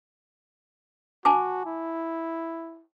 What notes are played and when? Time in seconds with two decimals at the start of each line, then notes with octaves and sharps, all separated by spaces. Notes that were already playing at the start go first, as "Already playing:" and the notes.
1.25 F#4 G#5 A5 D6
1.66 E4